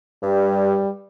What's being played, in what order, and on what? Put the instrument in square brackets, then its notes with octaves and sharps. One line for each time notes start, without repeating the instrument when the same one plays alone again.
[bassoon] G2 [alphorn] G3